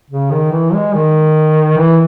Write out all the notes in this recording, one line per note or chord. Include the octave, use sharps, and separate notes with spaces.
C#3
D#3
E3
G#3
D#3
E3